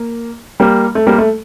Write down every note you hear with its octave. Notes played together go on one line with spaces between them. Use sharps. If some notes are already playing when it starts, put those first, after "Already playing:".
Already playing: A#3
G3 A#3
A3
G3 A#3
A3